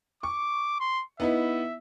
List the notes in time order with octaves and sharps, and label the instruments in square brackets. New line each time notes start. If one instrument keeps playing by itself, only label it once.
[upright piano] C#6 [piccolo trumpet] D6
[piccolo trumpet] C6
[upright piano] B3 D#4 E4 [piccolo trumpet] E5